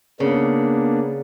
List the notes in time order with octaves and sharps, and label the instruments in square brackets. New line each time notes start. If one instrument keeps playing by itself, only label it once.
[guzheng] C#3 [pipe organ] A#3 B3 D4